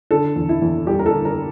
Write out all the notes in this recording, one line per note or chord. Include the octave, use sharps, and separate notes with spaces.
D3 A4
E2
E4
E2
G3 G4
A#4
A4
D3
A#4